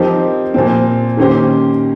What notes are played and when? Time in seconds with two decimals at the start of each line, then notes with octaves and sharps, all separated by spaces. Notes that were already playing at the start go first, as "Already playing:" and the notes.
Already playing: F3 C4 D#4 G4 A#4
0.54 A#2 F3 C4
1.17 D#3 A#3 C#4 G4 C5